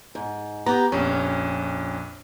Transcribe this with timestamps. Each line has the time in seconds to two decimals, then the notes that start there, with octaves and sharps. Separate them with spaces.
0.15 G#2
0.66 B3 G4 A#5
0.92 A#1 F2 C#4